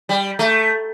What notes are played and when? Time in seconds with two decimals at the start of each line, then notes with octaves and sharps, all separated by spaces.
0.09 G3
0.39 A3